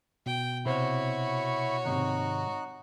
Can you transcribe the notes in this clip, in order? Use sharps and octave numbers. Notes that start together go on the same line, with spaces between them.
B2 G5
C3 E4 F#4 C5 C#5 B5
G#2 C3 D#3 D#4 F#6